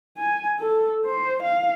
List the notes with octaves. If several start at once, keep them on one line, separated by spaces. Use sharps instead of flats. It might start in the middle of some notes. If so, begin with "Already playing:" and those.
G#5
A4
C5
F5